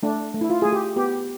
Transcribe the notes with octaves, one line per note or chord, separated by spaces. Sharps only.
A3 D4
A3
E4
F4
A3 G#4
G4
B3 G4